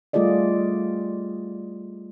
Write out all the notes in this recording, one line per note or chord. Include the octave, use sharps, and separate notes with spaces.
G3 A3 F4 G#4 D5 D#5